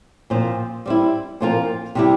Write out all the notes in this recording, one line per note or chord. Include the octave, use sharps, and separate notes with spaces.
A#2 F3 C4 F4 C5
G3 C4 E4
A#2 F3 C4 F4 A#4
C3 G3 C4 E4 G4